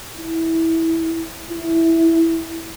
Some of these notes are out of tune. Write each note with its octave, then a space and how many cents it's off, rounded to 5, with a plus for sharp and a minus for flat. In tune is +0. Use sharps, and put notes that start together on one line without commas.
E4 -15
E4 -5